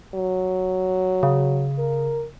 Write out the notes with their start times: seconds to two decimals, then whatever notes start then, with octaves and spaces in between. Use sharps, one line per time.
0.14 F#3
1.23 C#3
1.78 A#4